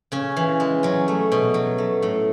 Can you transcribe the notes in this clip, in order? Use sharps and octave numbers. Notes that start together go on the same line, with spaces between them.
C#3 C#4
E3
G#3
F#3 C#4
A3
B2
F#3
A3
A2